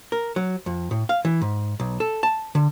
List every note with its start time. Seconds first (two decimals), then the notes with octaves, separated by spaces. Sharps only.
0.12 A#4
0.36 F#3
0.66 F2
0.91 A2
1.09 F5
1.25 E3
1.41 G#2
1.80 B1
2.00 A4
2.23 A5
2.55 D3